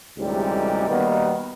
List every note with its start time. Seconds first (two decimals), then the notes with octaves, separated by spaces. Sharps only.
0.18 A1 D2 G#2 C3 G3 G#3
0.88 B2 D#3 G3 A#3 B3